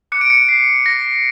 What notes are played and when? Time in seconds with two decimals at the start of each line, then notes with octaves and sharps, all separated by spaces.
0.12 D6 F#6 C#7
0.21 D7
0.30 C#7
0.49 C7
0.86 A#6